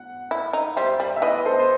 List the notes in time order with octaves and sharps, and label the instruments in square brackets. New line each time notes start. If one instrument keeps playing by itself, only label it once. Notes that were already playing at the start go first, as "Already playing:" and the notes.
Already playing: [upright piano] F#5
[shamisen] E4
D#4
[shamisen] G3 [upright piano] C5 E5
[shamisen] G3
[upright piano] E5
[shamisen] E3 [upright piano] B4 D#5
[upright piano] A4 C5
C5